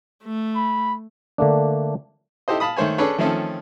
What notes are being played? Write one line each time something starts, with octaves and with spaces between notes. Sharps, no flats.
A3
B5
D3 A3 A#3 D4
D#4 E4 G4 A4 C5 D#5
F5 A5 B5 D#6
D#3 A3 C5 C#5 G#5
C#4 D4 G#4 A4 B4 C#5
D#3 F3 A3 C4 C#4 A4